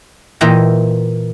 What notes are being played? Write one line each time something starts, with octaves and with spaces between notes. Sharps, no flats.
A#2 E3 D#5 E5 G5 A#5